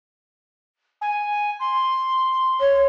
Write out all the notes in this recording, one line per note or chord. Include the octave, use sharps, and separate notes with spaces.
G#5
C6
C#5